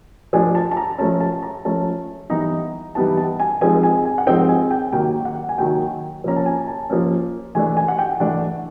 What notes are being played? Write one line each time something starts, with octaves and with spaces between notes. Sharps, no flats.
F3 A3 D4 G#5
A5
A5
A#5
F3 A3 C#4 A5
A5
A#5
F3 A3 C#4 A5
E3 G3 B3 D#4 A#5
E3 G3 B3 D#4 A5
A5
G#5
F3 G#3 C4 D#4 G#5
G#5
G#5
F#5
F3 G#3 C4 D#4 G5
G#5
G5
D#3 F#3 A#3 G5
F#5
G#5
D#3 F#3 A#3 G5
F3 A#3 C#4 A#5
A5
G#5
A5
F3 A#3 C#4
E3 A3 D4 G#5
G#5
F#5
G5
E3 A3 D4 F#5